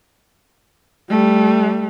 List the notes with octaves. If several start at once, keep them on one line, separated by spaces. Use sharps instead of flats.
G3 A3